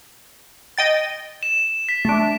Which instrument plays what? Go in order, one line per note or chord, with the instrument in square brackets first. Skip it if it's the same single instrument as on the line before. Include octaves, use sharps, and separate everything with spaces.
[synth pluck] D#5 G5 A6
[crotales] E7
B6
[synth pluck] A3 D4